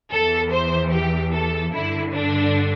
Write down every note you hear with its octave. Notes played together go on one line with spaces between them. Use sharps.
E2 E3 A4
C5
G4
A4
G2 D3 E4
D4